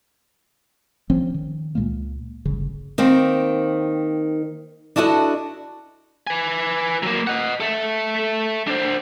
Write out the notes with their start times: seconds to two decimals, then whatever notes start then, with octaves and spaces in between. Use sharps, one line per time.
1.10 A#1 F3 C4 C#4
1.34 D#3
1.75 C#2 A#2 G#3 A#3
2.45 D1 G1 C#3
2.98 D#3 A#3 C4
4.96 D4 E4 F#4 A4 D5 D#5
6.27 B4 G#5
7.03 F#3 A#3
7.27 D#5 F#5
7.60 A4 E5
8.67 D4 C5